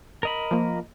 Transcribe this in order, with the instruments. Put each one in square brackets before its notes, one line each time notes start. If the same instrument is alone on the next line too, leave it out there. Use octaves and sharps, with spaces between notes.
[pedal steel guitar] A#4 D#5 B5
[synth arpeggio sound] F3 A#3